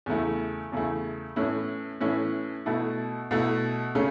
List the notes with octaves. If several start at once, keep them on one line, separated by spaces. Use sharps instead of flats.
E2 C#3 A3 E4
E2 C#3 A3 E4
A2 E3 C#4 E4
A2 E3 C#4 E4
B2 A3 E4
B2 A3 E4
C#3 A3 C#4